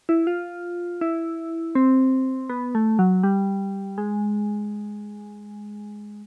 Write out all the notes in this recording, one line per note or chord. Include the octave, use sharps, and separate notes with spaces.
E4
F4
E4
C4
B3
A3
F#3
G3
G#3